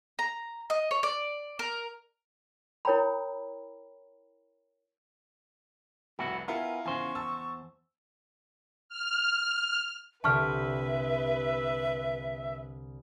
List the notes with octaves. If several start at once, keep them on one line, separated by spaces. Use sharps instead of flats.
A#5
D#5
C#5
D5
A#4
E4 A#4 C#5 G5 A#5 B5
F1 C2 E4 F#4 B5
B3 E4 F4 A#4 G#5
E2 C#3 C5 G#5 C#6
A5 E6
F6
C2 D3 G4 B4 E5 A5 C#6 F6